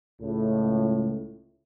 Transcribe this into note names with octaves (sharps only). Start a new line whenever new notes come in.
C#2 A2